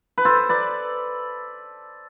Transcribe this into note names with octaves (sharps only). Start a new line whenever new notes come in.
B4
A4 C5
B4 D5